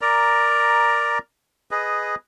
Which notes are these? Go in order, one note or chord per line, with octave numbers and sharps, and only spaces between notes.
A#4 D5 A#5
G#4 B4 D#5